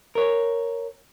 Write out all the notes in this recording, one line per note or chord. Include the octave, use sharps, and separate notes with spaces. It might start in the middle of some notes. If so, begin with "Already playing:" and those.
A#4 C#5